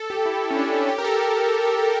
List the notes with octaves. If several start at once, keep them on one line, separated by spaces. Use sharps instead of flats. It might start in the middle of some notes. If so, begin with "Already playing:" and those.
Already playing: A4
G4
E4
E4
C#4
D4
C#4
G4
A#4
A4